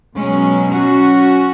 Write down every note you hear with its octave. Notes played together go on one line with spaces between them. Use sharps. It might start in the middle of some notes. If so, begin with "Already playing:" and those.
B2 F#3 G#3 C#4
C#4 F#4